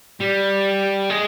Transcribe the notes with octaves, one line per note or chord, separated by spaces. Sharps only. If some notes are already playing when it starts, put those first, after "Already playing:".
G3
G#3